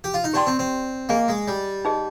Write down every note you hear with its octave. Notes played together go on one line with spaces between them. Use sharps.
G4
F4
D#4
D4 G4 D5 G5 C6
C4
C4
A#3 G#4 D#5 G#5
G#3
G3
D#4 G#4 D#5